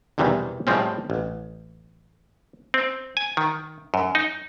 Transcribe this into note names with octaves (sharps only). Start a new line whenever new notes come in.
B1 E2 C3 D#3 E3 G3
A2 F3 G3 G#3 C4 C#4
A1
C4
G#5
D#3
F#2
D#4